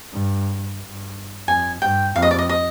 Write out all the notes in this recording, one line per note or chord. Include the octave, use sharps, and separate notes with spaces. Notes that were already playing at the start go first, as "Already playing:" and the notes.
G2
G2
F2 G#5
G2 G5
F2 F5
D#5
D5
D#5
D#5